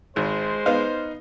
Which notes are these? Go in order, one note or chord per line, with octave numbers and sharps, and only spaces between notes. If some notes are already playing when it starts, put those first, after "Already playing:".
G#1 G#3 C5
B3 D#4 F5